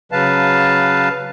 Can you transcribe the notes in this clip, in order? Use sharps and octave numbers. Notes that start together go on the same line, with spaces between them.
C#3 F#3 B4 F5 A5